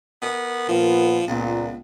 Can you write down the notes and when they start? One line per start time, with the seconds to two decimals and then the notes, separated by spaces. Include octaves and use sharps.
0.22 B3 A#4
0.69 A#2 F3 B3
1.28 C#2 A#2 B3